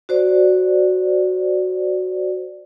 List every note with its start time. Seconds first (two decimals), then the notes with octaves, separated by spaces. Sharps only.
0.09 F#4 C5 D5